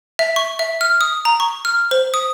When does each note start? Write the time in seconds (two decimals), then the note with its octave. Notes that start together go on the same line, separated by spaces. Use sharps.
0.19 E5
0.36 C#6
0.59 E5
0.81 F6
1.01 D#6
1.25 A#5
1.40 C#6
1.65 F6
1.91 C5
2.14 D#6